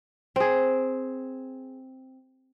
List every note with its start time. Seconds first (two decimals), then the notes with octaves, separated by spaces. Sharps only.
0.36 C4 G#4